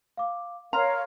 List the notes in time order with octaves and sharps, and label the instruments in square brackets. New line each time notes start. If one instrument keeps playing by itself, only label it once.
[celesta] F5 D6
[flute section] A#4 C#5 F5 [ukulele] A#5 [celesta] C6 F6